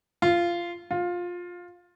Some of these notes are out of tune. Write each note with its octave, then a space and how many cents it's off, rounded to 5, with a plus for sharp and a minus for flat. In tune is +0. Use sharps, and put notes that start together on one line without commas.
F4 -15
F4 +15